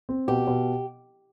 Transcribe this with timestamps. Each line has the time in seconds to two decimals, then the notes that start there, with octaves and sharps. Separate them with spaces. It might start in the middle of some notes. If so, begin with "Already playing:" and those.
0.09 C4
0.28 B2 G4
0.47 B2